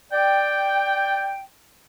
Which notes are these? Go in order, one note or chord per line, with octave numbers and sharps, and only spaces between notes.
D5 G5